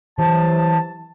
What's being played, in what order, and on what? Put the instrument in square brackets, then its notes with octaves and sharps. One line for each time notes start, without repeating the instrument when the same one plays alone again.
[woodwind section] C3 F#3 A5 [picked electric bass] E3